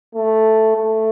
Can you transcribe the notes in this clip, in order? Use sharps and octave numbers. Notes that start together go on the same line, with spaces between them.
A3
A3